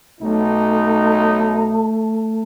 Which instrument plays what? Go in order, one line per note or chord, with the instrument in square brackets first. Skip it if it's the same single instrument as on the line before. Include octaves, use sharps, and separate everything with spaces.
[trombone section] B1 D#4 [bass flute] A3